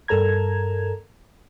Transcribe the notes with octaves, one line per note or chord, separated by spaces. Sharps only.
G2 A4 A#4 A#5 G#6